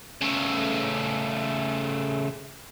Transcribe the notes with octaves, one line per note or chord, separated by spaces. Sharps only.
C#3 A3